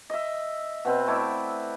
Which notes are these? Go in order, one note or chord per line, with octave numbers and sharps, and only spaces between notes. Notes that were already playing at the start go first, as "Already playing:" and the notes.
D#5 E5
B2 C4 B4
A3 E4 D5 E5